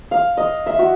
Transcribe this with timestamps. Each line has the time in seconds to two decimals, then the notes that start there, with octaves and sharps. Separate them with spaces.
0.11 F5
0.37 D#5
0.66 E5
0.79 F#4